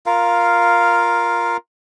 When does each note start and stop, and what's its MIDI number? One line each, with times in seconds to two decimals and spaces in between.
0.06 1.57 65
0.06 1.57 70
0.06 1.57 77